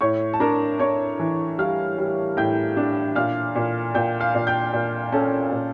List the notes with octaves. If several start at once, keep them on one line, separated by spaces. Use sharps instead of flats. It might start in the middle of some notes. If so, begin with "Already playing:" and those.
A2 C#5 C#6
A5
D4 A#4 A#5
D4 C#5 C#6
E3
G3 F5 F6
G3
A2 G5 G6
D4
A#2 F5 F6
A#2
A#2 G5 G6
F5 F6
A#2
G5 G6
A#2
C#4 A4 A5
A#2